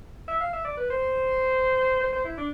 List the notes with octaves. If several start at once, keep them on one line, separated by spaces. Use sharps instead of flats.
E5
F5
E5
D5
B4
C5
C5
C5
E4
D4